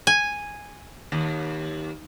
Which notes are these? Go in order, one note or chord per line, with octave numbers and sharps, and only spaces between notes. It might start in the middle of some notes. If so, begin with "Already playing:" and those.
G#5
D#2